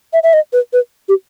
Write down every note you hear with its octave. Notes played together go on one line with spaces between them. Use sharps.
E5
E5
D#5
B4
B4
G4